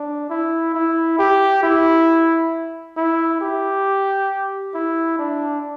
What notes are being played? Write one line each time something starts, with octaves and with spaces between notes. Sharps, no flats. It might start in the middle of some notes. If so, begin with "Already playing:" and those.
Already playing: D4
E4
E4
G4
E4
E4
G4
E4
D4